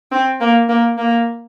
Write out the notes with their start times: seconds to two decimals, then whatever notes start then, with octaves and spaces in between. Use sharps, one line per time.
0.11 C4
0.41 A#3
0.69 A#3
0.97 A#3